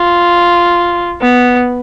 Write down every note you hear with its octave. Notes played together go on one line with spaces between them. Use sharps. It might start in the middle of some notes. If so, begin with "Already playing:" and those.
Already playing: F4
B3